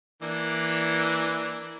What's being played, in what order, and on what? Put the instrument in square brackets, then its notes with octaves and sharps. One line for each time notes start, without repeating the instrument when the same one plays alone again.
[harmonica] E3 A#3 D4